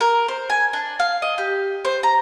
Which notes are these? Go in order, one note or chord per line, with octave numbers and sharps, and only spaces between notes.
A#4
C5
G#5
D4
F5
D#5
G4
C5
A#5